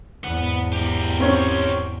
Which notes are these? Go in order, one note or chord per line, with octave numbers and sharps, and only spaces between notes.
E2 G#2 B3 F#5
G4 A#4
C4 C#4 C#5